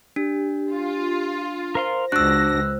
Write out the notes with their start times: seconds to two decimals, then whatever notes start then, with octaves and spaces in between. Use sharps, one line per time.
0.16 D4 G4
0.73 F4
1.75 A#4 C5 F5 C6
2.12 C#2 D4 F#4 D5 E6 F#6 A#6